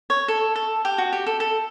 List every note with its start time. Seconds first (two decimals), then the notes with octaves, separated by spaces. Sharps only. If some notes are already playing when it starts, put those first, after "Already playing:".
0.10 C#5
0.28 A4
0.56 A4
0.85 G4
0.98 F#4
1.12 G4
1.26 A4
1.40 A4